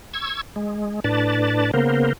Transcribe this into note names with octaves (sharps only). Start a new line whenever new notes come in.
C#6 E6 G#6
G#3
A2 D4 B4 D5 A5
C#3 A#3 B3 A#4 C5